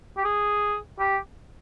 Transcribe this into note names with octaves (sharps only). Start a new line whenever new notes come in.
G4
G#4
G4